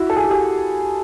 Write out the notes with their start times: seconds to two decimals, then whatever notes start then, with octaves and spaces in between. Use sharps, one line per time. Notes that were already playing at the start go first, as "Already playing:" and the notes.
Already playing: E4 F#4
0.10 A4
0.17 G#4
0.24 G4
0.31 F#4 G#4